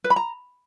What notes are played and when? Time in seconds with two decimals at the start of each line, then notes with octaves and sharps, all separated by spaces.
0.04 B4
0.10 B5
0.16 A#5